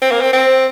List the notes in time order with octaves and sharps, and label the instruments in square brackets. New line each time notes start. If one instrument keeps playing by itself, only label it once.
[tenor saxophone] C4
A#3
C4
C4